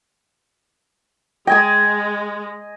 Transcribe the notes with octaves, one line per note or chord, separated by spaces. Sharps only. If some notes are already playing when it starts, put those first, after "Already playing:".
G#3 D#5 G5 G#5 D#6